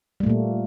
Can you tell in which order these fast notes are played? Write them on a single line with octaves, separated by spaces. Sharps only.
G3 A3 A#2 A#3